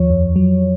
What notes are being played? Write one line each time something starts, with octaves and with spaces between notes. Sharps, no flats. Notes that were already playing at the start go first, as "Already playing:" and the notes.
Already playing: D#2 F3 C#5
F2
F#3